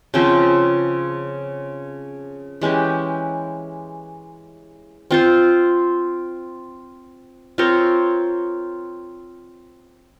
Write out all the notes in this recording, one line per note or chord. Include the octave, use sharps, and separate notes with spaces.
C#3 F3 C4
E3 G#3 C#4 G4
C4 F4 C5
C4 F4 A#4 C#5